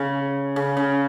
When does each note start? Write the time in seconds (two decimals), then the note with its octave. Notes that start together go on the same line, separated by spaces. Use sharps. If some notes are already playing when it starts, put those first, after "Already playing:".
Already playing: C#3
0.56 C#3
0.77 C#3